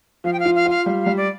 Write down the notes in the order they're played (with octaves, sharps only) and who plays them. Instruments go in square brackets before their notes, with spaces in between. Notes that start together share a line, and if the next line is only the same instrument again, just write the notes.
[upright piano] F3 [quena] F5
[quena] G5
F5
[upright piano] F4
[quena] F5
[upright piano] F4 [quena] F5
[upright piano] G3
[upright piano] G3 [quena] F5
[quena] D5